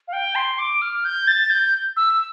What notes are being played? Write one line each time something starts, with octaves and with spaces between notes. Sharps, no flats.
F5
G5
C6
D6
F6
G6
A6
G6
E6